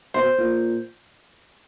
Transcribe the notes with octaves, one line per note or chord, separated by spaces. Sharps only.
B2 C5
A#2